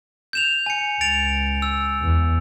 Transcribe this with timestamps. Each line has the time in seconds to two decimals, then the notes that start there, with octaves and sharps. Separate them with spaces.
0.33 G6 E7 F7
0.66 G#5 C#7
1.01 C#2 A6 D7 F7
1.62 E6
2.01 E2